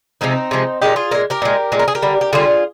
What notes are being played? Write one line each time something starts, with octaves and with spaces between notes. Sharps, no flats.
C3 F3 G#3 C4 D#4
C3 F3 G#3
A#2 G#3 D#4 G4
F4 G#4
A#2 G#3 A#4
G4 A#4
A#2 G#3
A#2 G#3
A#4
G#4
G4 A#4
D3 G3
G4
D3 G3 F4 G#4